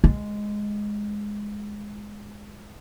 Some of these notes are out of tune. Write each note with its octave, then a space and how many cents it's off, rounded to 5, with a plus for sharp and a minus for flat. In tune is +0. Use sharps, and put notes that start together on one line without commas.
G#3 +0